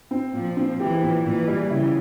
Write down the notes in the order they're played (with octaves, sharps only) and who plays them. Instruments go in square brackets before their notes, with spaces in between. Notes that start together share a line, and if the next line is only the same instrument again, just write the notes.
[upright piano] C4
[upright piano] A#2 [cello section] F3
[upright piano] C4
[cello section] E3 [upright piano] G4
[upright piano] A#2
[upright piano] A#2 [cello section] E3
[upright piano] G3
[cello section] C#3 [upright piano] E4